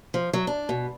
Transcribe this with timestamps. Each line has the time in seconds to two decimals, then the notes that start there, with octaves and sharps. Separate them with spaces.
0.14 F3
0.33 F#3
0.47 D4
0.69 B2